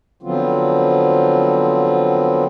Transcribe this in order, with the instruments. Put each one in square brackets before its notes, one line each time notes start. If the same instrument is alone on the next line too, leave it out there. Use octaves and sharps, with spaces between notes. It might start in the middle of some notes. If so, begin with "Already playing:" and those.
[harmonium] D3 F3 F#3 B3 C4 F4